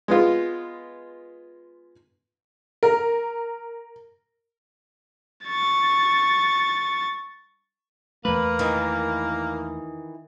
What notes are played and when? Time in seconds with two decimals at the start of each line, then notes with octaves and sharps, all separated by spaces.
0.08 G#3 B3 F4
2.83 A#4
5.45 C#6 A6
8.25 E2 A3 A#3 B4
8.59 D#3 E3